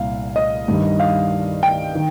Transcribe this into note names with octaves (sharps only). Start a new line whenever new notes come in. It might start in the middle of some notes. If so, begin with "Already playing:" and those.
Already playing: C2 A#2 F5
D#5
G2 D#3 G3
F5
G5
D#3